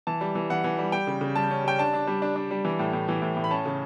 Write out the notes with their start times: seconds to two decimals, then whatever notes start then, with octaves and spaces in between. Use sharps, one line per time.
0.07 E3 A5
0.21 G3
0.35 E3
0.50 E3 F#5
0.64 E3
0.79 G3
0.92 G3 G5
1.07 C#3
1.21 C#3
1.36 G3 A5
1.50 C#4
1.64 G3 G5
1.79 D4 A5
1.93 D4
2.07 G3
2.22 D4
2.36 D4
2.51 G3
2.65 E3
2.79 A2
2.93 A2
3.08 E3
3.22 A2
3.37 A2
3.44 B5
3.51 C#4 A5
3.66 C#3